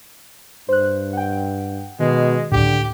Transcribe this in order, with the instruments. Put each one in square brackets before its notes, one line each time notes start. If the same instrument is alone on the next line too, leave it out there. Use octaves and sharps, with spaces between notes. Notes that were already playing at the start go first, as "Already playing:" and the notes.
[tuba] G2 [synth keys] C5 F#6
[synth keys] F#5 G5
[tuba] B2 [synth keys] D#3 [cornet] G#3
[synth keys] C#2 A2 [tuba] D3 [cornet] G4